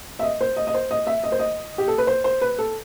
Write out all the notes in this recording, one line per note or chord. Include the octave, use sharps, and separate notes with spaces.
E5
D#5
C5
D#5
D#5
C5
D#5
E5
D#5
C5
D#5
G4
A4
B4
C5
C5
B4
A4